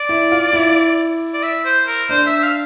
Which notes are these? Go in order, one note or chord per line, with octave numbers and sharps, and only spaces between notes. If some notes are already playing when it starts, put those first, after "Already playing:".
Already playing: D5
E4
F4
E4
D5
E5
C5
A#4
D4 C5
E5
E5
F5